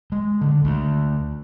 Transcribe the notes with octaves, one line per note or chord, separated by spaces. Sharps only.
G#3
D3
D2